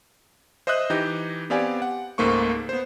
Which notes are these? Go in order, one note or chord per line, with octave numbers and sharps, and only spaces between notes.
C5 D#5 E5 D#6 F#6
E3 D#4 G4 G6 A#6
B3 C4 G4 D5 F5 G#5
F#5
C#2 G#2 A3 A#3 C5 C#6
B3 C5